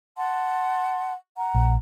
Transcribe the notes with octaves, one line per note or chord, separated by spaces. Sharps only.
F#5 A5 C6
F#5 A#5
A#1